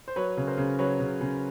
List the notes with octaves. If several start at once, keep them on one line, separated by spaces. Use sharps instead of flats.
C5
F#3 B4 C#5
C#3
A#4 C5
C#3
F#3 B4 C#5
C#3
C#3